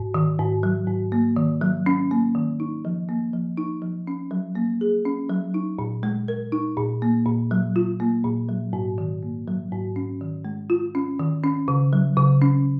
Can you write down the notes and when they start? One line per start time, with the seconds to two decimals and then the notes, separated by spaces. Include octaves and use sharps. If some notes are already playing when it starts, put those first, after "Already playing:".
Already playing: G#2
0.14 D#3
0.39 G#2
0.63 F#3
0.88 G#2
1.12 A#3
1.36 D#3
1.61 F#3
1.86 C#4
2.11 A#3
2.35 D#3
2.60 D#4
2.85 F3
3.09 A#3
3.33 F3
3.57 D#4
3.82 F3
4.07 C#4
4.31 F#3
4.55 A#3
4.81 G#4
5.05 C#4
5.29 F#3
5.54 D#4
5.79 A#2
6.03 G#3
6.28 A#4
6.52 D#4
6.77 A#2
7.02 A#3
7.26 A#2
7.51 F#3
7.76 F4
8.00 A#3
8.25 A#2
8.49 F#3
8.73 G#2
8.98 D#3
9.23 A#3
9.48 F#3
9.72 G#2
9.96 C#4
10.21 D#3
10.45 G#3
10.70 F4
10.95 C#4
11.19 D#3
11.44 C#4
11.68 C#3
11.93 F#3
12.17 C#3
12.42 C#4